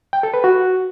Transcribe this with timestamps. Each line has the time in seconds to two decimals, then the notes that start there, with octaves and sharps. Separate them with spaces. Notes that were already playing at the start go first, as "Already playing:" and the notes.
0.13 G5
0.23 A4
0.34 B4
0.44 F#4